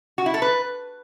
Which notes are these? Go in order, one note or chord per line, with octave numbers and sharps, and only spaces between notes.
F#4
E4
A4
B4